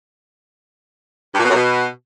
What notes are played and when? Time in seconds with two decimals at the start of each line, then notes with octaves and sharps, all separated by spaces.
1.34 G2
1.39 A#2
1.44 B2
1.49 F#2
1.54 B2